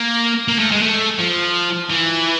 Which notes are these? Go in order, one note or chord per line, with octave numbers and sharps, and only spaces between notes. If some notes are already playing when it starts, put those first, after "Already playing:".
Already playing: A#3
A#3
A3
G#3
A3
F3
E3